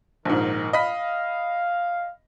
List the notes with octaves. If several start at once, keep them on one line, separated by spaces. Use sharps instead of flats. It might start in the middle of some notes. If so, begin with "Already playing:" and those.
A#1 G#2 D#3 A#4
D#5 F5 B5 B6